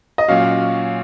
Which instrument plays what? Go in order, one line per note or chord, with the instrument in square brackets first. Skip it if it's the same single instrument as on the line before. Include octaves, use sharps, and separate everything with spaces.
[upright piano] D#5
[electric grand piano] A#2 F#3 C#4 F#4 [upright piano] F5